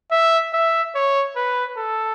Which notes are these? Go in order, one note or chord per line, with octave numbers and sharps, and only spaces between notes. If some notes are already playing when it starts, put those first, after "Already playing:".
E5
E5
C#5
B4
A4